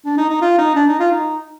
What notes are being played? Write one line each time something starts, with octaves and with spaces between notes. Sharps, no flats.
D4
D#4
D#4
F4
D#4
D4
D#4
F4
D#4